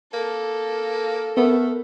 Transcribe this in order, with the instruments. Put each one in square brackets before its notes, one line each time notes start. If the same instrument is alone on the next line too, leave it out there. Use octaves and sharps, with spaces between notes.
[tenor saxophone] A#3 [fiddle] A4
[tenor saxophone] A3 [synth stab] B3 [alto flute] A#4